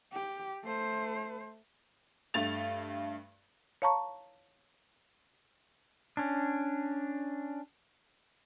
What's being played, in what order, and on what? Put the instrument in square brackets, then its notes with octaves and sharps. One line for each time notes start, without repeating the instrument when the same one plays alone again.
[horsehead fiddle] G4
A3 C5
[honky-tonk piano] G2 A3 A6 F7
[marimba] C#5 F5 A5 A#5 C#6
[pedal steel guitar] C#4 D4